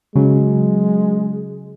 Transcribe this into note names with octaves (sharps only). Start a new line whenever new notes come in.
C#3 F#3 G#3